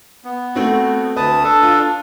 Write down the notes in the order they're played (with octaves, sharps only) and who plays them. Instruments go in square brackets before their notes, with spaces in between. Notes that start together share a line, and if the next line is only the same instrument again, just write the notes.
[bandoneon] B3
[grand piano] A3 C4 F#4
[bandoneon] D2 A5 D#6 [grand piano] B4
[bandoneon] D4 A4
[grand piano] F4